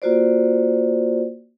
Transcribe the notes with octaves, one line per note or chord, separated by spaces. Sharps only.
A#3 F4 F#4 C5 D5